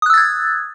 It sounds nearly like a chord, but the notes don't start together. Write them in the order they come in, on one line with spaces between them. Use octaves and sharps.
D#6 F#6 E6 A6 G#6